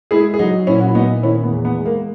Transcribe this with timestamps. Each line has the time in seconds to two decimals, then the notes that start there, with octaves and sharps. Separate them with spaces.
0.11 G#3 E4 G#4
0.34 G#4
0.39 F#3 D#4 F#4
0.67 A#2 C#4 E4
0.80 F#4
0.88 E4
0.95 A#2 B3 D#4
1.23 D#3 C#4 E4
1.43 B3
1.51 E2
1.65 B3
1.79 G#3
1.86 A#3